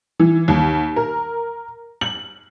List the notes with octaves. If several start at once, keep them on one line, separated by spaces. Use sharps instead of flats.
E3
D#2
A#4
F#7